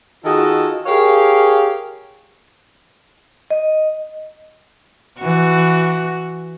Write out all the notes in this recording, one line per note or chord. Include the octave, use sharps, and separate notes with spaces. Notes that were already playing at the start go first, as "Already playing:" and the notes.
D#3 F4 F#4 G#4 A4 D#5
G4 G#4 A#4 C#5 F5
D#5
E3 F#4